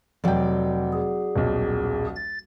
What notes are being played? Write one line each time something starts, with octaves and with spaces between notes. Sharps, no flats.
F1 F#3 D5 G5
G#4
D#1 B1
A6